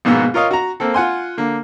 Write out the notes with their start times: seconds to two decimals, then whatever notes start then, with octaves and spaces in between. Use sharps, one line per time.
0.05 A#1 G#2 B2 A#3 B3 E6
0.34 F4 A#4 C#5 D#5 F5
0.51 F#4 A#5
0.80 A#3 C4 A4
0.94 F4 F#5 G#5 C6
1.37 D3 A#3